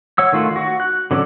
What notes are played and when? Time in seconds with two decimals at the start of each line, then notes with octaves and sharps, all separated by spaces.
0.18 C#5 F#5 E6
0.33 D#3 A3 F4 F#4
0.56 F#4
0.80 F#6
1.11 D3 F#3 C#4 A4 D5